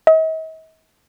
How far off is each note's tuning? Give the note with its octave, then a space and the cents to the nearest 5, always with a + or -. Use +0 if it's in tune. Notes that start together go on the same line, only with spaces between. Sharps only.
D#5 +45